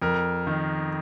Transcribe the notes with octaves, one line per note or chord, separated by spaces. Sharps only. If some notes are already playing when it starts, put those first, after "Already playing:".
F2 A#4
D#3